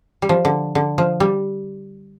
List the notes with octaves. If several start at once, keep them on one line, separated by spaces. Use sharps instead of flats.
G3
F3
D3
D3
F3
G3